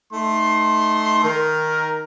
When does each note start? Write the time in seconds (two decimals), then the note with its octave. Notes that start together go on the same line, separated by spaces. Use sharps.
0.13 A3 D#4 C6
1.24 D#3 A#4